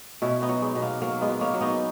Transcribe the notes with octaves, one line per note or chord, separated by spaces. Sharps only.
B2 C#4 E4
B3 D#4
F#3
G#3
B2
A#3
F#3 A#3
G#3 B3
B2
A#3 C#4
F#3
B3 D#4